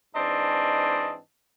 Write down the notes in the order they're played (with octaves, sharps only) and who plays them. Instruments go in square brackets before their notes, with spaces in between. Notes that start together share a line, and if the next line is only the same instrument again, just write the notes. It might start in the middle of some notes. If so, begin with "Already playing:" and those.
[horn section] G#2 E3 C4 D4 D#5 A5